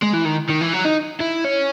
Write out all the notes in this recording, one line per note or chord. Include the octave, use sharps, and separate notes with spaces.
G#3
E3
D#3
D#3
E3
F#3
D#4
E4
C#4